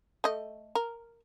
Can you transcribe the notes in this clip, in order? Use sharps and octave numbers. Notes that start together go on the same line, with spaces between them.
A3 D#5
A#4